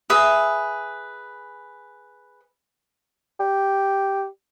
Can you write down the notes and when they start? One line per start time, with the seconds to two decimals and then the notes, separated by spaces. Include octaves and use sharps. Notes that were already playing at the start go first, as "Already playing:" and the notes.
0.10 G#4 B4 E5
3.40 G4